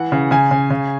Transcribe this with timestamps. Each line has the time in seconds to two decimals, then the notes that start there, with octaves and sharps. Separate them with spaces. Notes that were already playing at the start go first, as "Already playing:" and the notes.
Already playing: E3 F#5
0.12 C#3
0.31 C#3 G#5
0.51 C#3
0.70 C#3